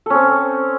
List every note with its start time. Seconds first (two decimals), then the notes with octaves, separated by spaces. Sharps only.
0.06 A4
0.10 C#4
0.14 C4